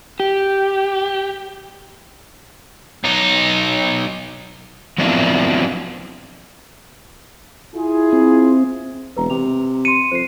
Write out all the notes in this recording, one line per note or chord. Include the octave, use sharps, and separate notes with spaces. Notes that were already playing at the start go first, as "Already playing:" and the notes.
G4
B1 D#4
F3 F#3 B3 C4 D4 E4
E4 F4 G#4
C4
E1 B4 A#5
C3 F7
C6 C#7 D#7
F2 C5 C7